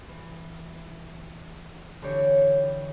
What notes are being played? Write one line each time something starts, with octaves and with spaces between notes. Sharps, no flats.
E3
D3 E3 D4 G4 C#5